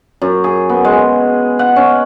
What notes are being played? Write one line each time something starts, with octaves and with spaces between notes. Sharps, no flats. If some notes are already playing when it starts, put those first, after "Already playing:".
F#2
G#4
B3
G#3
F#5
C#4